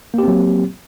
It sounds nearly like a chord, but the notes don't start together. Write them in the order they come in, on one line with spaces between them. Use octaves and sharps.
A#3 G4 C4 F#3